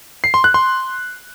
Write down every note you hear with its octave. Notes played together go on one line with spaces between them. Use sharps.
C7
C6
F#6
C6